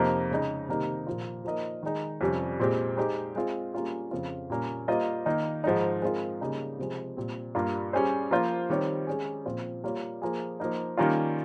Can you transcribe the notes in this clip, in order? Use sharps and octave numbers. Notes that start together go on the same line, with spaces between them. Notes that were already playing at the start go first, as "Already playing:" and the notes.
Already playing: F2 C3 F3 A#3 D#4
C#3 G#3 D#4
C3 D#3 G3 A#3 D#4
A#2 F3 A#3 F4
F3 A#3 D#4 A#4 D#5
D#3 G#3 D#4
F2 C3 G3 C#4
A#2 G#3 C4 G4
G#3 D#4 G4 C5
G#3 C4 F4
G3 A#3 C#4 F4 G#4
F2 C#3 F3 C4 F4
A#2 G3 A#3 C#4
G3 A#3 F4 C5 D#5
D#3 A#3 D#4
G#2 F3 G#3 D#4
G#3 C4 F4 A#4
C#3 G3 A#3 D#4 G#4
C3 F3 G#3
A#2 G3 C4
G2 G3 A#3 F4
G3 C#4 G#4 C5
F3 A#3 F4 C5
D#3 G3 C4 G4 C#5
G#3 C#4 G#4
A#2 F3 C4 F4 C5
G3 A#3 F4 A#4 C#5
F3 A#3 F4 G#4
F3 A#3 D#4
D#3 G3 A#3 C#4 F4